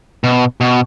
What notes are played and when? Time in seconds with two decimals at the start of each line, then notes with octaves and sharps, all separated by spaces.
0.24 B2
0.61 B2